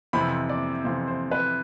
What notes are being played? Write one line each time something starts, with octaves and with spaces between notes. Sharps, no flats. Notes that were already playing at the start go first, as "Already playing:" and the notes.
F2 C3 E3 B5
D5
F2 C3 E3 C5
C5
B4